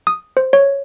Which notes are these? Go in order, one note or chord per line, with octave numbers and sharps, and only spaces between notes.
D#6
C5
C#5